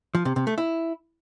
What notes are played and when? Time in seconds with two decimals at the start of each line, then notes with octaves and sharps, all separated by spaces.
0.15 F3
0.25 C3
0.36 C3
0.47 A3
0.58 E4